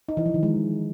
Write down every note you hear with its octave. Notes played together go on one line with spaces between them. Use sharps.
D#4
E3
F3
D#3
G#3